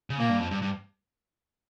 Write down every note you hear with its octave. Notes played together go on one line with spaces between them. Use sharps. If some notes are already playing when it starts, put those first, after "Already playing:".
C#3
A#2 A#3
G2
F2
G2
G2